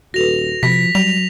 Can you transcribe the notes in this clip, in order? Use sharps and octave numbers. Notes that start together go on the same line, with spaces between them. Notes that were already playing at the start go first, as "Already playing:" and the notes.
D#1 F#4 A4 B4 A#6 F7
C3 F3 B5 B6
F#3 G3 F7